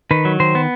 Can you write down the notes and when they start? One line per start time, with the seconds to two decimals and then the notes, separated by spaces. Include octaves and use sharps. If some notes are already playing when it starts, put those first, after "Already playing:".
0.11 D#3 B4
0.25 F#3
0.40 D#3 C5
0.55 B3